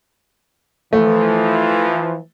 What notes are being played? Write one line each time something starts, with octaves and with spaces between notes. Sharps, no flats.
E3 F3 A3